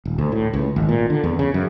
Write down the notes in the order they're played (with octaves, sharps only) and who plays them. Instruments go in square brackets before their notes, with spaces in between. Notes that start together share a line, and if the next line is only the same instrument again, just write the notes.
[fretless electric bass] D#1
D2
A2
C#2
G#1
A#2
D3
E2
C#3
F#2